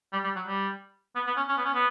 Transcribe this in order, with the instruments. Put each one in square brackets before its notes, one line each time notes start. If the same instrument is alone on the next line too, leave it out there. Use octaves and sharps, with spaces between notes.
[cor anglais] G3
G3
F#3
G3
B3
B3
C#4
C#4
B3
C#4
B3